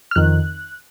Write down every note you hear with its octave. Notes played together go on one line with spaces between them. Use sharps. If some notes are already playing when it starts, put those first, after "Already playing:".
F6
F2 D#3 F#6